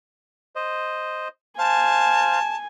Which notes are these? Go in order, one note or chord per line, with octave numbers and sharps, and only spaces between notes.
C5 D#5
C5 F5 G#5 A5